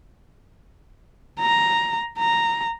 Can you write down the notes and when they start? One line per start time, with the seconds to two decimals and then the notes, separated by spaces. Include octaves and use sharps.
1.40 A#5
2.18 A#5